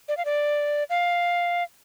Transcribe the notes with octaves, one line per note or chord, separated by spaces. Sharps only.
D5
F5
D5
F5